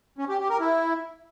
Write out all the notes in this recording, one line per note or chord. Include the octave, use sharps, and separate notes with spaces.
C#4
G4
G4
A#4
E4